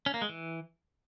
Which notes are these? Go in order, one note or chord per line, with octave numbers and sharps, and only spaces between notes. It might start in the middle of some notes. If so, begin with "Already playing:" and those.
C#4
A#3
G#3
E3